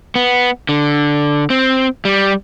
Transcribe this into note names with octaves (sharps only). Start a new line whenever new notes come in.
B3
D3
C4
G3